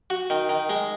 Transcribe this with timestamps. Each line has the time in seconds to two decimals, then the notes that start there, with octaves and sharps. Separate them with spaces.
0.10 F#4
0.30 D#3
0.49 D#3
0.70 G#3